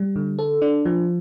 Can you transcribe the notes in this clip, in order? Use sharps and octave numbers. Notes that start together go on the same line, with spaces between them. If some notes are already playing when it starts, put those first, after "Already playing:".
Already playing: G3
D3
A4
D4
F3